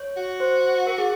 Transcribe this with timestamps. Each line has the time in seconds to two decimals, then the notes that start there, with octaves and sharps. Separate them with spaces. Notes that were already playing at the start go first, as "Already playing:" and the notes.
Already playing: C#5
0.17 F#4
0.40 C5
0.87 A#4
0.98 G#4